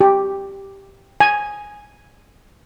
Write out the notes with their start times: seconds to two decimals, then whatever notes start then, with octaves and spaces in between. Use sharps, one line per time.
0.01 G4
1.20 G#5